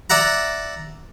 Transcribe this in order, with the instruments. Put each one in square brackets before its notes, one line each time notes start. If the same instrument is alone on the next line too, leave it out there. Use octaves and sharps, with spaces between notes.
[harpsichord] D5 E5 F#5 A#5